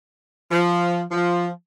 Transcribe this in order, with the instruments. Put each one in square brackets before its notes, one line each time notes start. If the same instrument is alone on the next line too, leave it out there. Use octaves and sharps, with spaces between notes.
[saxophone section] F3
F3